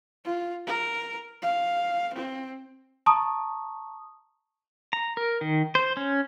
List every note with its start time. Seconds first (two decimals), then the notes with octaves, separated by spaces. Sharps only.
0.25 F4
0.67 A#4
1.42 F5
2.14 C4
3.06 A5 A#5 C#6 D#6
4.93 A#5
5.17 A#4
5.41 D#3
5.75 C5
5.97 C#4